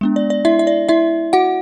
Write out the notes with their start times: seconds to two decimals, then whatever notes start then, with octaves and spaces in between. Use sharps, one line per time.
0.01 G#3 B3 D4
0.16 D5
0.30 D5
0.45 E4 E5
0.59 E5
0.67 D5
0.89 E4 E5
1.33 F#4 F#5